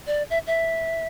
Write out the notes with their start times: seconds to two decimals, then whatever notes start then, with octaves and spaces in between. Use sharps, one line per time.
0.07 D5
0.30 E5
0.47 E5